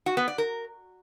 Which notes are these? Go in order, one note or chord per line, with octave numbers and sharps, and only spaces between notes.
F#4
B3
D5
A#4